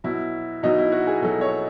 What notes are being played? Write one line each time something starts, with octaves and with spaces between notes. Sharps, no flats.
B2 F#3 E4
B2 F#3 D#4
E4
F#4
G#4
B2 F#3 A4
C#5